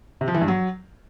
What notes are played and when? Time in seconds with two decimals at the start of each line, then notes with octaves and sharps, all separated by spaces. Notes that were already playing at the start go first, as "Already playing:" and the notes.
0.21 C3
0.28 F3
0.34 E3
0.41 G2
0.48 F#3